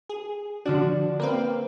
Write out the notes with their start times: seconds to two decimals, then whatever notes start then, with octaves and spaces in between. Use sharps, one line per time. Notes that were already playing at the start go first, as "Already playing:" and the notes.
0.09 G#4
0.65 D3 F3 D4 F#4
1.20 A#3 C4 A#4 B4 F5